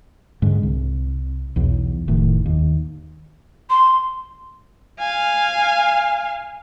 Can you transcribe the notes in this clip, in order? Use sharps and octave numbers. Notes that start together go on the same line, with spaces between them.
G#2 D3
C2
B1 E2
F1 A2 D#3
D#2
C6
F5 G#5